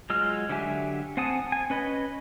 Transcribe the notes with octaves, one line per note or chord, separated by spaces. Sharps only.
F#3 G#3 F4 E6 F6
D3 F#3 G4 E5 G#5
C4 F#5 G#5 A5 D#6
G#5
C#4 B4 D#5 B5